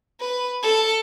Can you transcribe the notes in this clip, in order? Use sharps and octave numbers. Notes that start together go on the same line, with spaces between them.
B4
A4